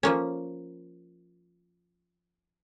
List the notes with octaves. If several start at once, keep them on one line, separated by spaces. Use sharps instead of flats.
F3 A#3 C#4